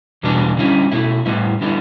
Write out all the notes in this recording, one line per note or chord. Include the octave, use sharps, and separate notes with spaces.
E2 B2 G3 B3 D4
D3 G3 C#4 E4
B2 A3 E4
A2 G3 B3 E4
D3 G3 B3 E4